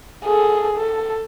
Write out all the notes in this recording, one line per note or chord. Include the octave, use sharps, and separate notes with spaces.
G#4 A4
A4